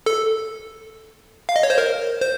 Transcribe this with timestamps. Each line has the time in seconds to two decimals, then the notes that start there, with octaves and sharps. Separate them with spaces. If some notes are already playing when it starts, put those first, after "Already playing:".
0.06 A4
1.49 F5
1.56 D#5
1.63 C#5
1.70 C5
1.78 A#4
2.21 C5